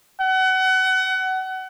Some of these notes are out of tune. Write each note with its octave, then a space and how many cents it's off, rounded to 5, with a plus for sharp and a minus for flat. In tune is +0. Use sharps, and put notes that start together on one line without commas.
F#5 +30